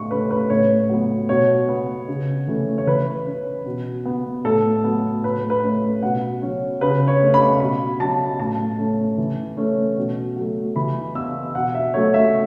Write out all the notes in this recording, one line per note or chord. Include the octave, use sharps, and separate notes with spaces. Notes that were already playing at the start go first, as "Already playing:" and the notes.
Already playing: A2 C#6
A3 C#4 B4
B4
A2 C#5
F#3 B3
B2 C#5
B3
C#3
E3 A3 C#4
C#5
E3 B4
C#4
B2
B3
A2 A4
F#3 B3
A2 B4
B4
A3 C#4
B2 F#5
F#3 C#4
C#3 B4
C#5
A3 C#4
B5
B2 B5
F#3 C#4 A5
A2 A5
A3 C#4
E3
A3 C#4
B2
F#3 A3
E3 B5
B3 E6
B2 F#5
E5
F#3 A3 C#4 C#5
E5